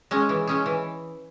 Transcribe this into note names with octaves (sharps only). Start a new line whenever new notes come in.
G#3 C#4 G#4
E3
G#3 C#4 G#4
E3